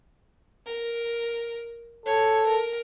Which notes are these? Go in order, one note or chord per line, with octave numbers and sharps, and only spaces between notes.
A#4
A4 C#5
A#4